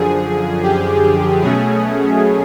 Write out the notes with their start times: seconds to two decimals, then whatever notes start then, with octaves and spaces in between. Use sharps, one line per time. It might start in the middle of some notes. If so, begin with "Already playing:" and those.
Already playing: F#2 D3 F3 G#4
0.62 G4
1.41 B2 F#3 A3 C#4 G#4